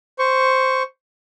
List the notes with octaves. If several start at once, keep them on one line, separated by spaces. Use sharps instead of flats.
C5 C#6